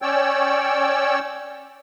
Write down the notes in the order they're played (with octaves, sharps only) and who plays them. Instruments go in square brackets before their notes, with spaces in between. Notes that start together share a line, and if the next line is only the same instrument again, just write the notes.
[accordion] C#4 C#5 D5 G5 E6